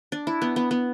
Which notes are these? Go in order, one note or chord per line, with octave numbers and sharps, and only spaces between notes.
D4
E4
B3
B3
B3